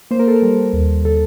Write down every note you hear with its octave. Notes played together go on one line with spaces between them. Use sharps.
A#3 C5
A#4
A4
A#4
G3
D#2
D3 A4